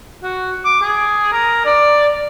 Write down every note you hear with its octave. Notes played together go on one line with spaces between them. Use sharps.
F#4
D6
G#4
A#4
D5